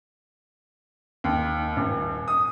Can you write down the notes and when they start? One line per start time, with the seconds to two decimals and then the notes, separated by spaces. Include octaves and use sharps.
1.24 D#2
1.77 D#1
2.28 D#6